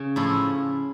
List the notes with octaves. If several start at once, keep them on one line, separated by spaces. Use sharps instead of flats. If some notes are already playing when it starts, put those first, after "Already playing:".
Already playing: C#3
A2 F3 A3 E4